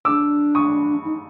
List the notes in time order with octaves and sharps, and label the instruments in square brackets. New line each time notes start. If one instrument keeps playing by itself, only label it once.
[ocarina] D4 [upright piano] D6 E6
[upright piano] C#6 D#6
[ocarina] D#4